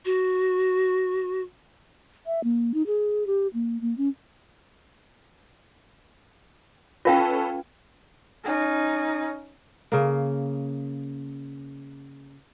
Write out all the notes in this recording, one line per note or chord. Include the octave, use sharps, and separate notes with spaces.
F#4
E5
A#3
D#4
G#4
G4
A#3
A#3
C#4
C#4 F4 A4 B4 F5 G5
C#4 D#4
C#3 A#3